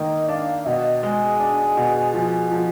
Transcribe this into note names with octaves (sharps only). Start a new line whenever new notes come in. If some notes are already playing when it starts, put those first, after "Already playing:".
Already playing: D#3 A#3 D#5
D4 F5
B2 D#5
G#3 G#4
D4
B2
F3
F3